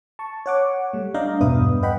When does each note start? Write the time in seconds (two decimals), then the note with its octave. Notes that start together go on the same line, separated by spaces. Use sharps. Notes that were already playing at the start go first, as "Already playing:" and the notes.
0.19 A5 C#6
0.46 C#5 F#5 D6
0.93 G3 A3
1.14 D4 D5 D#5 F5 A#5 G6
1.40 E2 G2 B2 B4 E5 D#6
1.83 B4 D#5 F#5 G5 B5